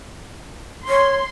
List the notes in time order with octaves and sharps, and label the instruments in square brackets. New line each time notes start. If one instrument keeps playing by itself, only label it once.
[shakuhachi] C#5 [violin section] C6